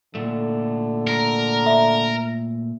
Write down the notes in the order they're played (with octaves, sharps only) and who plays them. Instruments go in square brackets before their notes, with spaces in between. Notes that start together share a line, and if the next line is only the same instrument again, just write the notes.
[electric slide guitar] A#2 A3 [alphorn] D3
[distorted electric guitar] A#4
[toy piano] E5